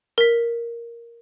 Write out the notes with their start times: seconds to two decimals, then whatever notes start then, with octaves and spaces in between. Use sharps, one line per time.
0.18 A#4 B6